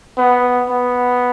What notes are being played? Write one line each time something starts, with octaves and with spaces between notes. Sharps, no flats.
B3
B3